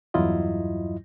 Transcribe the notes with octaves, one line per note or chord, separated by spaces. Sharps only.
E2 G2 F#3 E4 F4 D#5